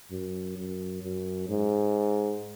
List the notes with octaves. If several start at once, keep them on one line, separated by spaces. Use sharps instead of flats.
F#2
F#2
F#2
G#2